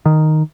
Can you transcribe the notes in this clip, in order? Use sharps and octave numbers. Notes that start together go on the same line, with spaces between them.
D#3